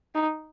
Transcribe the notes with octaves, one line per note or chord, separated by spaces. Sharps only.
D#4